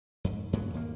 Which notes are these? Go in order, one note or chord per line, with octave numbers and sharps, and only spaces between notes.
F2 G#2
G2 A#2 C#3 F#3
D#2 A#3